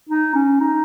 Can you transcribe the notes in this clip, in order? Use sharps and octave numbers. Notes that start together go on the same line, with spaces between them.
D#4
C#4
D#4